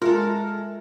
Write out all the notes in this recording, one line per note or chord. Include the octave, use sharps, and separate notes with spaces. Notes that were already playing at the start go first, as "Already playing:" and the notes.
G#3 F4 A4 A#4 E5